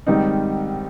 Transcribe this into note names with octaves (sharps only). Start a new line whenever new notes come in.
G#2 D#3 G3 C4 D#4